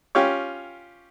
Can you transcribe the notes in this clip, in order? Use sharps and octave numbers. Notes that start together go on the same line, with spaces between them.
C#4 F4 G4 C#5